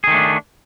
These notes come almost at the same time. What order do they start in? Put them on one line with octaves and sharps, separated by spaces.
G#4 D#3 A3 D4